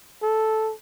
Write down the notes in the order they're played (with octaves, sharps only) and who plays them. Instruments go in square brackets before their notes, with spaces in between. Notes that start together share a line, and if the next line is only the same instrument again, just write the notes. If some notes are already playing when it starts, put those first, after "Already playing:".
[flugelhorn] A4